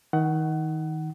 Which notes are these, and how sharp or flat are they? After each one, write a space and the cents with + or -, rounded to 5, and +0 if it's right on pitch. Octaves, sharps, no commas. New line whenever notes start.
D#3 +25 F#5 +20